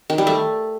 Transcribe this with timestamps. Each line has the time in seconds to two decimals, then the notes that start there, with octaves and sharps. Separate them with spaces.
0.10 D#3
0.18 G3
0.27 A3